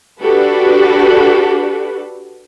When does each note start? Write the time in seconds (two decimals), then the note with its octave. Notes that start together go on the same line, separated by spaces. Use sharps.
0.21 D4 F#4 G4 A4 B4